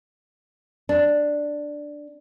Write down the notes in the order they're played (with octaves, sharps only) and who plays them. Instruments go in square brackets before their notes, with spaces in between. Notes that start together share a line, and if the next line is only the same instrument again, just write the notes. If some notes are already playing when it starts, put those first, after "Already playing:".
[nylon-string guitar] D4